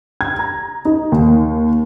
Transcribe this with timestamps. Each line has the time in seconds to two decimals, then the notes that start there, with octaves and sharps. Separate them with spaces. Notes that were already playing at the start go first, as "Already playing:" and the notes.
0.21 G#6
0.39 A#5
0.85 D#4
1.12 D#2